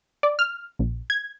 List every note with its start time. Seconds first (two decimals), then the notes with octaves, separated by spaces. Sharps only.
0.23 D5
0.39 F6
0.79 A#1
1.10 G#6